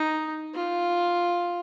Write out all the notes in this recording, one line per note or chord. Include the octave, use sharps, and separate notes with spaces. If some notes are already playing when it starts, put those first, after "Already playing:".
Already playing: D#4
F4